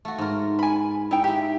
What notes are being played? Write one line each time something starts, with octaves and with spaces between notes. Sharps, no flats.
A3 F#4
G#2 A#4
G#5 B5
D#4 E4 G5
E4 G4 E5